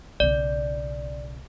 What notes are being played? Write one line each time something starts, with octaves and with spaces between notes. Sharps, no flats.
B1 C#3 D5